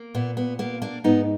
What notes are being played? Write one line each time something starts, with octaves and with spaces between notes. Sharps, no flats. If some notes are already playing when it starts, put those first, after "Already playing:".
Already playing: A#3
A#2 B3
B3
A#3 B3
A#3 D4
G#2 B3 D#4